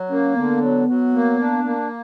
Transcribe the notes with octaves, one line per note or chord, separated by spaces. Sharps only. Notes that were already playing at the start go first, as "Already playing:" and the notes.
Already playing: F#3
A#3 C#4
D3 B3
F#3
F#3
A#3
D4
A#3